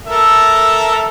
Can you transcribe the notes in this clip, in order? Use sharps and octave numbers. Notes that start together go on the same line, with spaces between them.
A4 A#4 E5